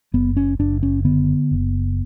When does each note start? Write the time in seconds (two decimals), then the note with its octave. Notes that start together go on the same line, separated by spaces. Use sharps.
0.14 F#1 B3
0.37 C#4
0.59 F#1 D4
0.83 C#4
1.05 D3 B3
1.51 F#1